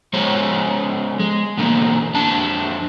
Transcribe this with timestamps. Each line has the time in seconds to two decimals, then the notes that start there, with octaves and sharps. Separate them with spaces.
0.13 F3 G#3 B3 G#4 C5 C#5
1.20 G#3
1.57 B2 D3 E3 A#3 C4
2.14 F2 C4 D4 A5